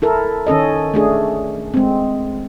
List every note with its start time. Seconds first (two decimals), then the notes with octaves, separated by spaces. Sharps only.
0.02 E4 A4 A#4
0.47 D#3 C#4 A4 D#5
0.94 A3 D4 G#4
1.74 G#3 C4